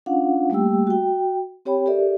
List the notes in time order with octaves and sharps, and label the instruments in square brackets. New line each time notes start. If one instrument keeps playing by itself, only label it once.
[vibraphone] C#4 D4 F4 F5 F#5
G3 A3 A#3 G4 G5 E6
F#4 G5
C4 G4 C#5 G5 B5
G4 A4 A#4 D5 E5